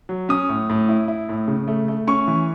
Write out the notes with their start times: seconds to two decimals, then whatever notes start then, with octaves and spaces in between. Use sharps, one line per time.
0.09 F#3
0.29 C#4 D#6
0.49 A2
0.70 A2
0.89 E4
1.08 E4
1.29 A2
1.48 C#3
1.68 A3
1.88 A3
2.07 C#4 C#6
2.28 E3